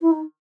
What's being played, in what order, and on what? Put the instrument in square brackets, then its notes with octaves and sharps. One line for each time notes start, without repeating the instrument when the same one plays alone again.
[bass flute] E4
D#4